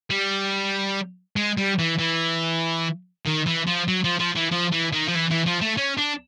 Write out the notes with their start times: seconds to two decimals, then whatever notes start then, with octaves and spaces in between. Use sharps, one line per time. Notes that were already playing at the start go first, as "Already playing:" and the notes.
0.10 G3
1.36 G#3
1.57 G3
1.79 E3
1.99 E3
3.26 D#3
3.46 E3
3.67 F3
3.88 F#3
4.04 F3
4.19 F3
4.36 E3
4.51 F3
4.72 E3
4.93 D#3
5.08 F3
5.15 E3
5.30 E3
5.46 F3
5.61 A3
5.77 C#4
5.98 D4